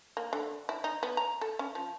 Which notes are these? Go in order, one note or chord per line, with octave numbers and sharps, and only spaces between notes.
A#3
D3
E4
D#4
B3
A#5
A4
C#4
F3